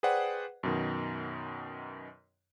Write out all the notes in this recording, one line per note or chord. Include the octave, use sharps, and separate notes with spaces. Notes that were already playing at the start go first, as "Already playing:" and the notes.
G#4 B4 C5 D5 F#5 G5
F#2 B2 D#3